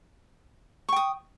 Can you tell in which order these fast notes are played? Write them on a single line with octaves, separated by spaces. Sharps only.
C#6 G5 D#6